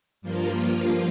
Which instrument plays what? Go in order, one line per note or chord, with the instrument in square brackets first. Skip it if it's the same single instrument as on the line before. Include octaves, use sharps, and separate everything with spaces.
[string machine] G2 F3 A#3 F4